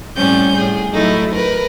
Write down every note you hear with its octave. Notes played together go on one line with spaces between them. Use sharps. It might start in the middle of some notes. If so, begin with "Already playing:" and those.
A2 G3 C4 C#4 G6
A2 G#4
F#3 A3 D#4 E4
A#4 B4